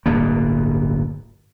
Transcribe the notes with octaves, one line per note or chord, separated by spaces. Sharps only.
D1 G1 B2 A#3